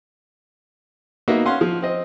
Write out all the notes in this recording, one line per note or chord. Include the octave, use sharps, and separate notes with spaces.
A#3 B3 D#4 F#4 E5
C#4 F5 F#5 C6
F3
C4 D#5